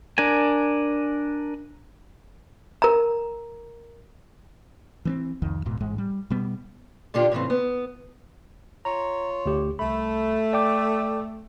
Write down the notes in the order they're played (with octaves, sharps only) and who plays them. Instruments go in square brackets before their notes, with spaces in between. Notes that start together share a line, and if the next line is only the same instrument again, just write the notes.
[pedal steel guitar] D4 A#4 G#5
[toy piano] A#4 A#5
[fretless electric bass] E3 B3 C4
C2 F2 D#3
D1 G#2 B2
A1 G#2 G#3
G3
B2 G3 B3
[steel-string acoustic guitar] A#2 D3 D4 F4 G4
A2 C#3 E3 C4
B3
[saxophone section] F4 C#5 [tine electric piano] A#5
[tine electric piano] D2 G4
[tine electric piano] C2 B5 [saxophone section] A3
[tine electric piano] D5 G5 D6